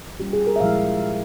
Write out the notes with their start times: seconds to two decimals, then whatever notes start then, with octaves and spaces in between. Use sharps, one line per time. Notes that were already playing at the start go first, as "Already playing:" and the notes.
0.20 G3 A#3 C#4 F4 G4
0.33 G#4
0.47 A#4
0.56 E5
0.60 A#2 F3 G#3 E4 F5